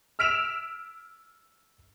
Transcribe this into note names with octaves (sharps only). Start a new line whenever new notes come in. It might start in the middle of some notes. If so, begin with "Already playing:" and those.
E6 F6 B6 D7 E7 F7